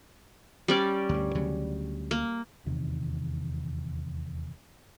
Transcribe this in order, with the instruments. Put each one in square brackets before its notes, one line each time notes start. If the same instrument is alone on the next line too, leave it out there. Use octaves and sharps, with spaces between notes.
[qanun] G3 C#4 D5
[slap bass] D2 G2
D2 C#3 F#3
[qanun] A#3
[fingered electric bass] D#1 E2 C3 D#3